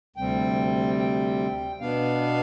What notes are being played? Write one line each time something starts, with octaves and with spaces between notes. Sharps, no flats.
D2 C3 G3 C4 G5
G5
B2 B3 D4 F5